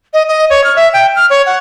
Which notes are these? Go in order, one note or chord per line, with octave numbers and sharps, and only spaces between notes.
D#5
D#5
C#5
F6
E5
G5
F6
C#5
F#5